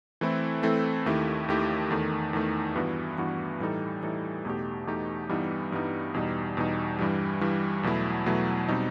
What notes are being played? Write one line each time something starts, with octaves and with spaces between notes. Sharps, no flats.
E3 A3 C4 E4 A4
E3 A3 C4 E4 A4
D#2 D#3 A3 E4 G4
D#2 D#3 A3 E4 G4
E2 D#3 A3
E2 D#3 A3
G2 E3 B3 F#4
G2 E3 B3 F#4
A2 E3 G3 D#4 A4
A2 E3 G3 D#4 A4
E2 B2 A3 D#4 G4
E2 B2 A3 D#4 G4
G2 E3 G3 B3 D#4
G2 E3 G3 B3 D#4
E2 B2 G3 D#4
E2 B2 G3 D#4
G2 E3 G3
G2 E3 G3
E2 B2 F#3 A3 E4
E2 B2 F#3 A3 E4
B2 G3 C4 D#4